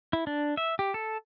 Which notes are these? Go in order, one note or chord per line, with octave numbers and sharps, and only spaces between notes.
E4
D4
E5
G4
A4